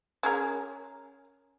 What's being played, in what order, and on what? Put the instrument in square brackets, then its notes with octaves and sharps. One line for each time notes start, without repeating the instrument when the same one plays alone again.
[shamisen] C#4 G#4 A#4